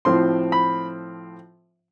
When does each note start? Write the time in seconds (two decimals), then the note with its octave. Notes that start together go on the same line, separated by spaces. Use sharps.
0.05 A2 F3 C4 C6
0.52 B5